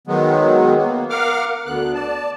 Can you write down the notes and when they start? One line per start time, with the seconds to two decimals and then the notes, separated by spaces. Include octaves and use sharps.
0.07 D#3 F#3 G#3 B3
0.76 A#3 B3
1.10 A#4 F5 F#5 D6 F6
1.66 D2 D3 B3 F#6
1.94 D5 A5